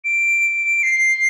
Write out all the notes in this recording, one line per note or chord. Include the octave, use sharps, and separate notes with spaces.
D7
C7